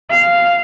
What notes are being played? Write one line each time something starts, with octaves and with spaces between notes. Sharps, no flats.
F5